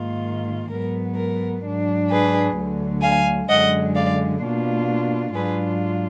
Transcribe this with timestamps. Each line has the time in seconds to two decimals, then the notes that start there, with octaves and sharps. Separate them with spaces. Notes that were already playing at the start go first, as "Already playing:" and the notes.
Already playing: G#2 D#3 A#3 F4
0.70 G#2 F#3 B3 A#4
1.16 A#4
1.63 G#2 F#3 D4
2.10 G#4 B4
2.56 D2 D3 F#3
3.02 F5 G#5
3.48 F#2 D3 G#3 D#5 F#5
3.95 D5 F5
4.42 B2 A#3 D4 F4
5.34 G#2 F#3 D4 F4 G#4 B4